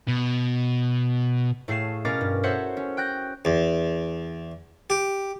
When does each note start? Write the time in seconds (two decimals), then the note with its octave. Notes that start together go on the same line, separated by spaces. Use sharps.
0.08 B2
1.68 A2 A3 G#4 F5 C7 E7
2.05 B2 C#4 A#4 F5 D6 A6
2.21 G2
2.43 F#4 A4 C5 C#5 E5 F#5
2.77 C#4
2.97 G5 F#6 G6 A#6
3.45 E2
4.90 G4